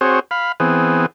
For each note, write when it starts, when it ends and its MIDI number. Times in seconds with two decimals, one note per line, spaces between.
0.01 0.20 60
0.01 0.20 66
0.01 0.20 68
0.01 0.20 72
0.01 0.20 73
0.31 0.52 77
0.31 0.52 83
0.60 1.06 52
0.60 1.06 59
0.60 1.06 60
0.60 1.06 68